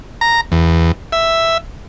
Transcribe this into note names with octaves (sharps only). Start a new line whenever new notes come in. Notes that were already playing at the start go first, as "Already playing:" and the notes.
A#5
E2
E5